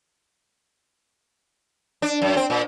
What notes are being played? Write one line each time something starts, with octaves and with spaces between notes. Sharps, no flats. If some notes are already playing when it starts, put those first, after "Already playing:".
D4
F#2
C4
A#2